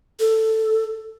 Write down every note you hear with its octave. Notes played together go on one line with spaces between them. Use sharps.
A4